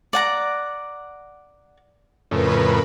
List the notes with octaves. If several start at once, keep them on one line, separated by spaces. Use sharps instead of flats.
D5 F#5 A#5
F2 A2 C#3 A#4 B4 B5